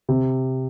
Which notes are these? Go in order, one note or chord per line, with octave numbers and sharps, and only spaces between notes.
C3